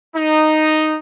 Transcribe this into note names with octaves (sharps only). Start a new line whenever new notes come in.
D#4